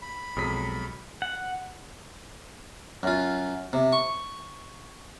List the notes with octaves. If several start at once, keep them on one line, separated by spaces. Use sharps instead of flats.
B5
B1 F2 F#3 G#3 D#6 B6
F#5
F#2 F4
C3
C#6